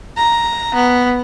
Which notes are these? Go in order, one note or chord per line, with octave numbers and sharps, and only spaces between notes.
A#5
B3